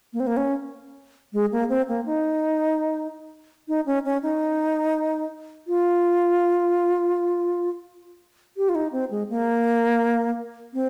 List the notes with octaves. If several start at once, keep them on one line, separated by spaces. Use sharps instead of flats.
A#3
C4
A#3
C#4
G#3
A#3
C4
A#3
D#4
D#4
C#4
C#4
D#4
F4
G4
F4
D#4
C4
G#3
A#3
C4